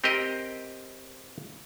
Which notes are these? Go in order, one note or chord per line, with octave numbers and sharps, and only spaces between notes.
C4 G4 A#4 D#5